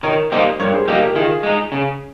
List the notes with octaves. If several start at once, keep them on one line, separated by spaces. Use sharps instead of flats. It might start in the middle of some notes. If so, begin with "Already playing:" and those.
D#3 A#4 C#5
G3 A#3 D#4 C5 D#5
G2 A#4 C#5
G#4 C5
G3 A#3 D#4 G4 A#4
G4 A#4
D#3 F4 G#4
G#3 D#4
C#3